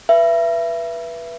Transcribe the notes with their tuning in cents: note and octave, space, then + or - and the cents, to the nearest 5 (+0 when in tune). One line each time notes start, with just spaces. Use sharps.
B4 -20 E5 +25